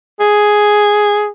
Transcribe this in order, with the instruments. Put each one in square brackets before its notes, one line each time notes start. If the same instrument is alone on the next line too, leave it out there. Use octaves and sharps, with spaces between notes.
[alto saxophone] G#4